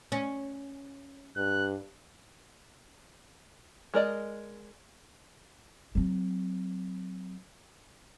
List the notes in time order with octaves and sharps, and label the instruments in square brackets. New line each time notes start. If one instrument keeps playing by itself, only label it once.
[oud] C#4
[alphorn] G2 [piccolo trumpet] F#6
[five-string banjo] G#3 A#4 D5 D#5
[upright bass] F#3 C4